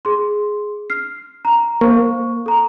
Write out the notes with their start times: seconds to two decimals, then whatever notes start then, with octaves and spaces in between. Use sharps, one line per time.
0.05 G#4 C6
0.90 F6 C7
1.45 A#5
1.81 A#3 C5 C#6
2.46 A4 A#5